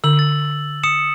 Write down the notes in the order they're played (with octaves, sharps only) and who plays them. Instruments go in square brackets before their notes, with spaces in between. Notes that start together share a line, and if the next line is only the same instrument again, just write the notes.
[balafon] D3 [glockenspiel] E6 F#7
[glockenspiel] A6
D#6 C#7 E7